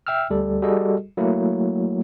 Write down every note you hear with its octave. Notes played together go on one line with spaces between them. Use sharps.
E5 G5 E6 F6
D2 G3 A4
G3 F#4 G#4 A4 D#5
F#3 A3 A#3 E4